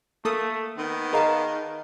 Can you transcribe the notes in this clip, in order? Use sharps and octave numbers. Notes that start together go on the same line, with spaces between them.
A3 A#3 A4 D#6
D#3 B3
G#4 A#4 D#5 F5 A5 A#5